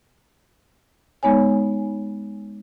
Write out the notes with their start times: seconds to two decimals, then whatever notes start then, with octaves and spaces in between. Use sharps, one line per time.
1.23 G#3 B3 D#4 C#5 G#5